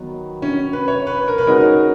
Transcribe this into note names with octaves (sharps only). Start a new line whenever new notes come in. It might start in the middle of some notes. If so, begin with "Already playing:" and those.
Already playing: D#3 F#3 B3
C#4
B4
C#5
B4
A#4
B4
C#3 G#3 D#4 F#4 A#4 C#5